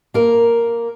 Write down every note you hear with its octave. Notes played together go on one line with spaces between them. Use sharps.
A#3 A#4